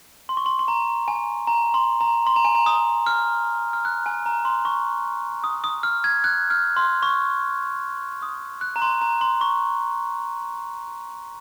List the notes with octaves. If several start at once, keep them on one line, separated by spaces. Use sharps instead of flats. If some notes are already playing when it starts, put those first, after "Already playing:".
C6
C#6
C6
C6
A#5
G#5
A#5
C6
A#5
C6
A#5
G#5
A#5
D#6
F6
F6
F#6
G#5
A#5
C6
C#6
D#6
D#6
F6
G#6
F#6
F6
C6
C#6
D#6
F#6
A#5
C6
A#5
C6
C#6